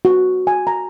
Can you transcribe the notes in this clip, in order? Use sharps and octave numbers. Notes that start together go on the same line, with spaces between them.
F#4
G#5
A#5